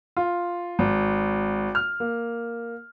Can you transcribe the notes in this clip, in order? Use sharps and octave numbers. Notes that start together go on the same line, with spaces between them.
F4
G#1
F6
A#3